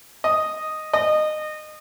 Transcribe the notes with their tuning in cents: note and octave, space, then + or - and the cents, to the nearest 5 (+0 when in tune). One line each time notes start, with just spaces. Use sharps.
D#5 +0
D#5 -20